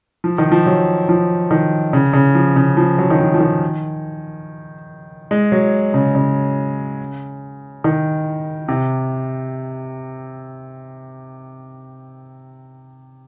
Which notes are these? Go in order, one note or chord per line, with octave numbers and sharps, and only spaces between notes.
F3
D#3
F3
F#3
F3
D#3
C#3
C#3
F3
C#3
F3
F#3
D#3
F3
F3
D#3
G#3
F#3
C#3
C#3
D#3
C3